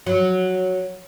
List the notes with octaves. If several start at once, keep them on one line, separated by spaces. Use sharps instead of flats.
F#3